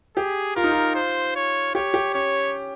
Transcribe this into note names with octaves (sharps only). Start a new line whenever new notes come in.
G4 G#4
F4 A#4
D#4
F4
C5
C#5
G4 C#5
G4
C#4 C#5